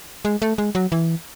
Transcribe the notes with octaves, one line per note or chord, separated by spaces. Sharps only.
G#3
A3
G#3
F#3
E3